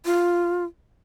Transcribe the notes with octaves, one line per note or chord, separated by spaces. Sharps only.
F4